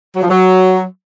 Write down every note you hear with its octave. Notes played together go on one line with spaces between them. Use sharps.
F#3
F3
F#3